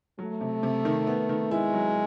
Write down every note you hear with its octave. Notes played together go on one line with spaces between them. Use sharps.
F#3 A3
C3
C3
D#3
B3
D#3
G#3 E4
F#3